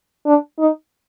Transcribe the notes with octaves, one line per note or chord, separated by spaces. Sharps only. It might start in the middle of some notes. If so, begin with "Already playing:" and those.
D4
D#4